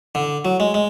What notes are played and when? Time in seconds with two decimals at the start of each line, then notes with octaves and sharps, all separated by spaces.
0.15 D3
0.45 F#3
0.60 G#3
0.74 G#3